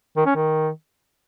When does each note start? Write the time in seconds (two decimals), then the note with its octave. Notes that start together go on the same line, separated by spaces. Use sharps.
0.17 D#3
0.26 C#4
0.36 D#3